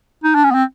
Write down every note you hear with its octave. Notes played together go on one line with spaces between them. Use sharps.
D#4
D4
C#4
B3
C4